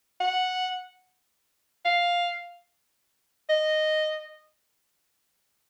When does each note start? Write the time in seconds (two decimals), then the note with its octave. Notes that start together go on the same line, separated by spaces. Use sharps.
0.21 F#5
1.85 F5
3.50 D#5